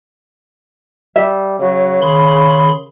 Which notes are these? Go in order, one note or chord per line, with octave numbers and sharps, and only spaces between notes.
G3 E5
C#3 F#3
D#3 G#4 B5 C6